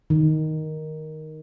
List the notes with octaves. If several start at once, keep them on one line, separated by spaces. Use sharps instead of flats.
D#3